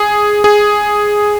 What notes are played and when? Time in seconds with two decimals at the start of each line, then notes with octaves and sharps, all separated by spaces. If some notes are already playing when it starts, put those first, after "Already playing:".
Already playing: G#4
0.44 G#4